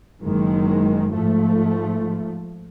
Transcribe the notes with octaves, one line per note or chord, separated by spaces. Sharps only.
F#1 D#3 G#3
G#2 F3 A3